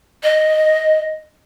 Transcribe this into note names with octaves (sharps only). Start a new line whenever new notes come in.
D#5